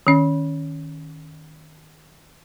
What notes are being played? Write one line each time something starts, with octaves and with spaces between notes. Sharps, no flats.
D#3 C#4